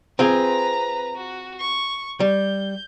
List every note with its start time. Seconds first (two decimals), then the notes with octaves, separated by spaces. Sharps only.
0.19 C4 F4 G#4 B4 A#5
1.15 F#4
1.60 C#6
2.20 G3 G6